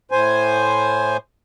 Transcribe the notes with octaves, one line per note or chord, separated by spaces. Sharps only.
A2 C5 G#5